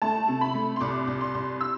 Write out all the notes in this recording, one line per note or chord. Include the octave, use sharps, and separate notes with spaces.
A3 A5
C3
B5
A3
C6
C2 D6
C2
C6
C2
E6